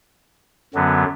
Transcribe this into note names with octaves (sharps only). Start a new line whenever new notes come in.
F#2 D3 F#3 B3